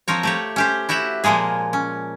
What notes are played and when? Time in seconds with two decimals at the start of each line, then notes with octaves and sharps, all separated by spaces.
0.08 F3 C4 A#4 C#5
0.23 A3 G4 C#5
0.56 C#4 G4 C5
0.89 E4 F#4 G4 E5 F#5
1.24 A#2 F3 G#3 A#3 G#4
1.73 C#4